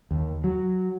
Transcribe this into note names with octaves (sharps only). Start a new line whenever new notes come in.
D#2
F#3